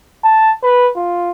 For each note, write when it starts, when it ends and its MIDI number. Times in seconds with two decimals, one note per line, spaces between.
0.24 0.53 81
0.63 0.90 71
0.96 1.32 65